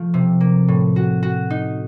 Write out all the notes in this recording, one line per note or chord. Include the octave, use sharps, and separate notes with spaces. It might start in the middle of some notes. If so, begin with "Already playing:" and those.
Already playing: F3 A3
C3
A#3
A2
F#4
F#4
D#4